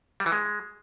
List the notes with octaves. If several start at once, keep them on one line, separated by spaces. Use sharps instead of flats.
G3
E3
G#3